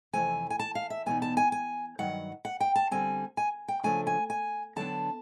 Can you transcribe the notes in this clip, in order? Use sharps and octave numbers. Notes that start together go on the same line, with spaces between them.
F2 C3 E3 A3 G#5
G#5
A5
F5
E5
E2 B2 F#3 B3 D#4 G#5
A5
G#5
G#5
G2 D#3 F#3 F#5
F#5
G5
A5
D3 G3 C4 G#5
G#5
G5
C#3 F3 A3 D4 G#5
G#5
G#5
D3 F#3 B3 D4 A5